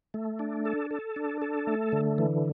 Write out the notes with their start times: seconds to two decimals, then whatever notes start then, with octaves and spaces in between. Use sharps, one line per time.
0.14 A3
0.39 D4
0.65 A4
0.91 A4
1.16 D4
1.42 A4
1.67 A3
1.92 D3
2.18 E3